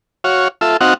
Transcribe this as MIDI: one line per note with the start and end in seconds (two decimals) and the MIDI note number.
0.24 0.48 66
0.24 0.48 73
0.24 0.48 77
0.61 0.77 65
0.61 0.77 69
0.61 0.77 76
0.81 0.94 60
0.81 0.94 63
0.81 0.94 66
0.81 0.94 77
0.81 0.94 78